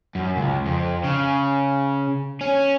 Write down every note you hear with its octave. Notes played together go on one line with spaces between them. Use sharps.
F#2
C#2
F2
C#3
C#4